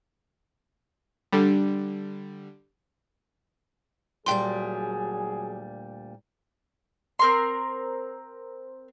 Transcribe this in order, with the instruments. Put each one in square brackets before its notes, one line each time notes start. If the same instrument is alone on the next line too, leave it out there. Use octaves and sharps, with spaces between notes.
[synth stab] D3 G3
[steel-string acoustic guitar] D2 A#2 G3 [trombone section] F#3 G#4 [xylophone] G5 C6
[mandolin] C4 A#4 C6